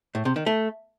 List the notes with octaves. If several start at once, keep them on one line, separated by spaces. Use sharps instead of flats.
A2
C3
D#3
A3